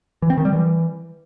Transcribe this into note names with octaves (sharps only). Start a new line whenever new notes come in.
E3
C4
D#3
G3
E3